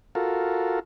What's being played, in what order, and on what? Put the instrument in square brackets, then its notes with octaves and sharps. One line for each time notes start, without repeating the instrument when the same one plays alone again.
[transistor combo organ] F4 F#4 A4 A#4